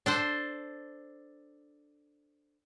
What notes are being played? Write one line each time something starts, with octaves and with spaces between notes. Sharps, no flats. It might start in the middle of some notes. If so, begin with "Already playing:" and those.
D4 A4 C5